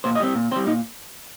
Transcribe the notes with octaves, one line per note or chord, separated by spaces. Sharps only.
A#2 C5
D#5
G3 C4
A#2
G3 C4 C5
A#2 D#4